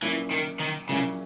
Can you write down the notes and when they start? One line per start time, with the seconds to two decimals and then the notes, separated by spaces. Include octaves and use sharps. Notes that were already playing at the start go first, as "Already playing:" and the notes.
0.02 A#2 E3 F#3 A#3 C#4 E4
0.31 D#3
0.60 D#3
0.89 A#2 C#3 F#3 A#3 C#4 E4